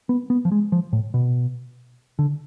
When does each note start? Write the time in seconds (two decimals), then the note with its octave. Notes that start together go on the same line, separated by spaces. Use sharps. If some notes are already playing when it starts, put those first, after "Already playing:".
0.09 B3
0.30 B3
0.45 F3
0.52 G#3
0.72 F3
0.93 A2
1.14 B2
2.19 D3